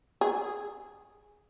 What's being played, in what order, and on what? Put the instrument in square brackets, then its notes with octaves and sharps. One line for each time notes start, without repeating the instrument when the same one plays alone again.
[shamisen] G#4